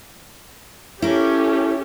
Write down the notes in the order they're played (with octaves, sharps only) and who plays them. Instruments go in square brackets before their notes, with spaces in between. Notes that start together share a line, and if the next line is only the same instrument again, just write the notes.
[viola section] C#4 G4 A4 [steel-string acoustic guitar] E4 A#4